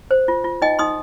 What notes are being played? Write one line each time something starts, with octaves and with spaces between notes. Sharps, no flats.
C5
F4
F4
D#4 D#5 G5
D#4 C6 D#6